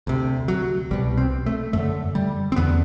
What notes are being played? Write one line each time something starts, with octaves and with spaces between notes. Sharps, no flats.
D2 C3
F#3
C2 B2 G3
C4
A3
F#2 D3 A3
G3
C4
E2 D3 B3